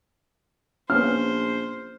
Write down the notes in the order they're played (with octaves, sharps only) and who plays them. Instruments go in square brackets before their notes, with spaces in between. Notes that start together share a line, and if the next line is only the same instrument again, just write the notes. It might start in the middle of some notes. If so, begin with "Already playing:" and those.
[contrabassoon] A#1 [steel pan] A#3 B3 C#4 [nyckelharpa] C5 [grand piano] F6